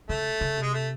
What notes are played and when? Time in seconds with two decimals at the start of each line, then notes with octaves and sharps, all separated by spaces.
0.09 C#3 A3
0.41 C#3
0.57 C3
0.62 G#3
0.73 A3